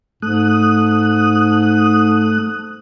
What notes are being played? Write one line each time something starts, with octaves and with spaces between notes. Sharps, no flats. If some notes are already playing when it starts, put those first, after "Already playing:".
G#2 A3 D#6 F#6